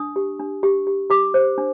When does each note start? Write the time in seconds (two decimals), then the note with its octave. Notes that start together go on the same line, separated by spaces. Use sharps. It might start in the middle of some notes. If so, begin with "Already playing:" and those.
Already playing: D4 D#6
0.16 G4
0.40 D4
0.63 G4
0.87 G4
1.10 G4 D6
1.34 C5
1.58 D4